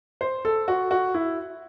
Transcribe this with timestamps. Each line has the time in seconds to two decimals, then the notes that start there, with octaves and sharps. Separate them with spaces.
0.21 C5
0.45 A4
0.68 F#4
0.91 F#4
1.14 E4